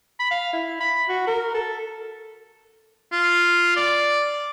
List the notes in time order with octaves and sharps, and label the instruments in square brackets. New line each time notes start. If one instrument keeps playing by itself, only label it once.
[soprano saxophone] B5
F5
E4
B5
F#4
A#4
A4
[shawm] F4
D5